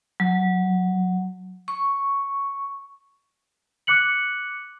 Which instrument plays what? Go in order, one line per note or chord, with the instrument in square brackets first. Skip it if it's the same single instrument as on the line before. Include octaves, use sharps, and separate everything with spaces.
[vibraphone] F#3
C#6
[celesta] D6 F#6 C#7 F#7